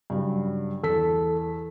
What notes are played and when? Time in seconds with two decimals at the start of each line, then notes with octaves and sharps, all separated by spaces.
0.10 G2 C#3 F#3
0.84 E2 A4 B6